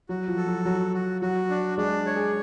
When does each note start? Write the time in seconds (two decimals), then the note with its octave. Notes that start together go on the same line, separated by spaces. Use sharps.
0.09 F#3 F#4
0.28 F3
0.37 A4
0.47 F#3
0.65 F#3 F#4
0.94 F#4
1.21 F#3 F#4
1.50 D4
1.78 G#3 D4
2.06 C#5
2.16 G#4